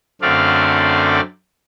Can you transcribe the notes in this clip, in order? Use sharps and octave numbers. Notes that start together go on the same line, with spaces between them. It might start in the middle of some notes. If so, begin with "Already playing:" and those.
F#2 D3 A3 C4 D5 F5